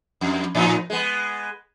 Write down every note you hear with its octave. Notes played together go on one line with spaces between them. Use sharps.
F2
A2 F3 D#4
G#3 B3